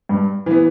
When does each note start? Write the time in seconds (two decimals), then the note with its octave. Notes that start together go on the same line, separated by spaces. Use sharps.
0.09 G2
0.46 E3 B3